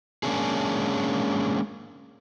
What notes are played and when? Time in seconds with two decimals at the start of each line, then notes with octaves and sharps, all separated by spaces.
0.23 G#3 A#3 B3 C#4 D4 G#4